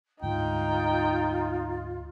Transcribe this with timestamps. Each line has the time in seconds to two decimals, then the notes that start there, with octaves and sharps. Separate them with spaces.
0.22 D2 G#2 D#4 F4 G5